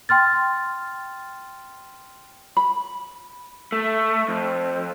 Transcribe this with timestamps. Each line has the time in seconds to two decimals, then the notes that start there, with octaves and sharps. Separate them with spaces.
0.09 G5 C6 F6 A6
2.57 B5
3.72 A3
4.28 F2